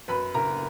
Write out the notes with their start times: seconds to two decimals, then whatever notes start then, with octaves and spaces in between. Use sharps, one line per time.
0.08 F#2 B4 B5
0.34 F#1 A#4 A#5